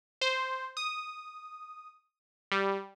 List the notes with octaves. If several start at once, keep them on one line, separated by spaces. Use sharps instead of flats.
C5
D#6
G3